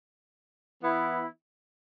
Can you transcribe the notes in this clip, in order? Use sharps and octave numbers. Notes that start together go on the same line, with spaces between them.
E3 B3 E4